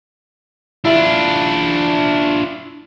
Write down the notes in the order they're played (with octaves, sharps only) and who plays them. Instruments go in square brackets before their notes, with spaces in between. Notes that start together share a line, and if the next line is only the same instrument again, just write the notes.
[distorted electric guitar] D4 F4 [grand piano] E4 E5